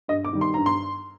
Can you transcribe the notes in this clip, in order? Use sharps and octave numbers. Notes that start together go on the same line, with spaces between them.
G2 D#5
D6
D#3 G3
C6
G2 A#5
C6